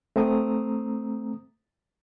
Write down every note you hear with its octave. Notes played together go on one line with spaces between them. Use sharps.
A3 C4 A#5 D#6